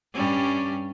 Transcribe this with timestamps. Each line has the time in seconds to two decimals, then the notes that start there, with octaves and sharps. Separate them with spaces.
0.13 G2 G3 C#4